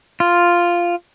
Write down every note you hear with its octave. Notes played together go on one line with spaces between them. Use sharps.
F4